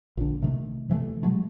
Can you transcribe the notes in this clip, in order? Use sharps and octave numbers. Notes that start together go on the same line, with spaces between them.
A#1 D3
C3 D#3 A3
C3 E3 G3 A3
B2 F#3 G#3 A3